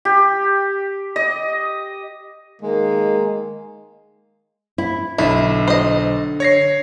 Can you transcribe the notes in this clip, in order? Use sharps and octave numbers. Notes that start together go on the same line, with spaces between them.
G4
D#5
D#3 G#3 A#3
E4
B1 D3 E4
C5 D#5
C#5 A#6 C7